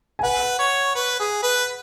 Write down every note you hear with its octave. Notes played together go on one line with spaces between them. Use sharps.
G#5
B4 F#5
C#5
B4
G#4
B4